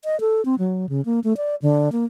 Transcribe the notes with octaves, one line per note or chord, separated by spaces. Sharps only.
D#5
A4
C4
F#3
C#3
A#3
A3
D5
D3
A#3